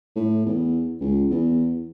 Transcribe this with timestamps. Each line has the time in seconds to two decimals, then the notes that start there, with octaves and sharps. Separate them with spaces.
0.16 A2
0.46 E2
1.01 C#2
1.30 E2